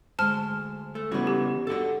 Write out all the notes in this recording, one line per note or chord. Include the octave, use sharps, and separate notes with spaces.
D2 G#3 C5 A5 F6
A3
C#3 E3 G3 B3 F#4
G4
D4 D#4 F#4 A4 F#5